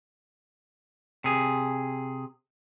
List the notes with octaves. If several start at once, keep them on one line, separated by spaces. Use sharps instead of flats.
C3 G#4